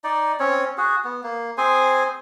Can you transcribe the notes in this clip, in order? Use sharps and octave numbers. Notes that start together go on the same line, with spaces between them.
D#4 D5
C4 C#4 C#5
F#4 G#4
B3
A#3
C4 G#4 C5 G#5